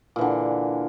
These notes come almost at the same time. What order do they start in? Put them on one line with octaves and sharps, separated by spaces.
A#2 E3 D3